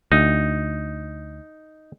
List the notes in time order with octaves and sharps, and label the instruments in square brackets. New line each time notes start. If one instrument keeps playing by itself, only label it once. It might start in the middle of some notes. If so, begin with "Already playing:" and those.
[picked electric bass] D2 [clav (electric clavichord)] D#4